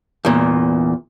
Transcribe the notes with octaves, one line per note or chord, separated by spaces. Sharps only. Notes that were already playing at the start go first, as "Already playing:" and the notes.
E2 A#2